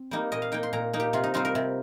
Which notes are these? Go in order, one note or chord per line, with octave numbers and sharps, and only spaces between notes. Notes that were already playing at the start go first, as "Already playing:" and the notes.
Already playing: C4
G3 A#3 D#4
A#2 D#5
F5
A#3 D#4 G5
C6
A#2 A#5
A#3 D#4
G4
C3 F4
D#4
G3 C4 D#4 F4
A#4
C3